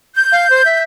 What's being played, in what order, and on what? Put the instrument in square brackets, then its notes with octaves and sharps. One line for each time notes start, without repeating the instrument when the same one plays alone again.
[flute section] G6
[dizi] F5
C5
E5